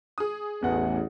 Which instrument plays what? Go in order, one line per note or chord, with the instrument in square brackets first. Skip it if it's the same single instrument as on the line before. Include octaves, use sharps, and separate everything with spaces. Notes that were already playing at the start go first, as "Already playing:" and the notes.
[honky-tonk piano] G#4 D#6
[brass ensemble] A1 [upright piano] E2 F#5